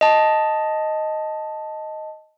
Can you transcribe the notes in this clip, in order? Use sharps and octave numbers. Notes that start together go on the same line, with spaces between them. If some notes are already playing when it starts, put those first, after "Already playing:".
D#5 A5